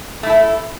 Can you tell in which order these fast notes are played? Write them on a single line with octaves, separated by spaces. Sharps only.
A3 E4 A4